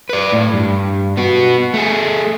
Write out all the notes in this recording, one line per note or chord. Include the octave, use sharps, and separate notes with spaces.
B4 D5
A2
G2
B3 F#4
A3 G#4